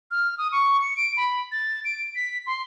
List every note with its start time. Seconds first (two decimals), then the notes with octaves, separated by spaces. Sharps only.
0.11 F6
0.38 D#6
0.52 C#6
0.81 C#7
0.97 D7
1.17 B5
1.52 A6
1.85 D7
2.15 B6
2.47 C6